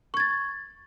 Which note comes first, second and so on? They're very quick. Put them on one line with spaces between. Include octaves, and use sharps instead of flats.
C#6 G#6 A6